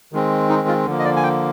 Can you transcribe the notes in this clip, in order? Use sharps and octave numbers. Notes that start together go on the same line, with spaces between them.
D#3 G#3 C4
D#4
F4
D3 F3 A#3
D#5
D5
G#5
G5